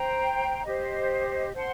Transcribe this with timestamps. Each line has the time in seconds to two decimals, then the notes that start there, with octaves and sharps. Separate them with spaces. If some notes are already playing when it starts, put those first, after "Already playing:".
Already playing: C5 G5 A#5
0.65 G4 C5 D#5
1.53 C5 F#5 A5 C6